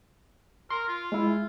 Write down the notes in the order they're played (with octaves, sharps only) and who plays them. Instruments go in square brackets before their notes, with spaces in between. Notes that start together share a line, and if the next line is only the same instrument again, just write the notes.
[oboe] A#4 [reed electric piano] C6
[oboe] F4
[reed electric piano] G#3 E4